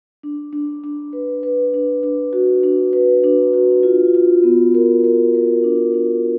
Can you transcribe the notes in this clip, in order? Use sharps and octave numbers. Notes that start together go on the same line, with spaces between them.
D4
D4
D4
B4
B4
D4
D4
F#4
D4
B4
D4
F#4
F4
F4
B3
A#4
A#4
A#4
D4
D4